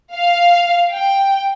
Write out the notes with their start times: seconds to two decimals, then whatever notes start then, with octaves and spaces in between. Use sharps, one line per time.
0.15 F5
0.94 G5